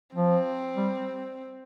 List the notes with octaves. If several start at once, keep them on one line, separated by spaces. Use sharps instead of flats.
F3 C4
G3